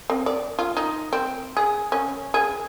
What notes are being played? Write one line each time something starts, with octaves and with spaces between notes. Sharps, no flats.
C4
D5
F4
D#4
C4
G#4
C#4
G#4